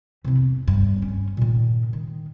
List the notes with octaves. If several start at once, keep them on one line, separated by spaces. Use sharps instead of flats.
C3 E3
E2
G2
C#4
A#2 D#3
D#3